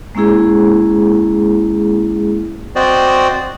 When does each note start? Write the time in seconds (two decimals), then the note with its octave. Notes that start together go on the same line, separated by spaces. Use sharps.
0.15 G#3 A#3 C#4 E4 G#4
2.76 C4 F#4 C5 D5 D#5